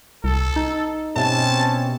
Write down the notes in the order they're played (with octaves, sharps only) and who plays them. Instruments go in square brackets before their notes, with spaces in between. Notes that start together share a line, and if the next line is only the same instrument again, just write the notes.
[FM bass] C2 [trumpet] A4
[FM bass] D#4
[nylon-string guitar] B2 E5 [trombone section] C4 C#4 G4 [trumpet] A5